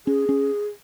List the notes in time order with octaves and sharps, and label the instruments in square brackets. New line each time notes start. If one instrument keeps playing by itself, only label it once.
[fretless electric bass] C#4 [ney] G#4
[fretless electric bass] C#4